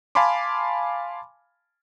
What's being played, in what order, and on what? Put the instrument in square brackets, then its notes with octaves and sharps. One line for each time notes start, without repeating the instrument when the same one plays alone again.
[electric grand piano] F5 G#5 A5 B5 C6 D6